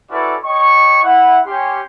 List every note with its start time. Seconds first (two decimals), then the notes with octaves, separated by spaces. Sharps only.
0.10 C#4 E4 F#4 A4 B4 D5
0.44 C#5 D#5 G5 C#6
1.03 E4 F#5
1.45 C#4 G4 C6